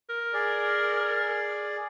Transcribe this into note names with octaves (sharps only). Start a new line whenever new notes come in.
A#4
G#4 D5